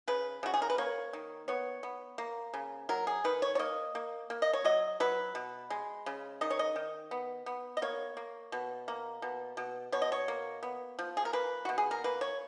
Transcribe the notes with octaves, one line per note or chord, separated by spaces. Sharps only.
C#3 B4
C#3 F#4
G#4
A#4
B4
A#3 C#5
D#3
B3 C#5
B3
A#3
C#3
F#3 A#4
G#4
D#3 B4
C#5
C#5
A#3 D#5
A#3
A#3
D#5
C#5
F#3 D#5
F#3 B4
B2
G#3
C#3
D#3 D#5
C#5
D#5
D#3
B3
B3
D#5
A#3 C#5
A#3
B2
A#3
B2
B2
B2 C#5
D#5
C#5
A#3
B3
F3
G#4
A#4
A#3 B4
B2 F#4
G#4
A#4
A#3 B4
C#5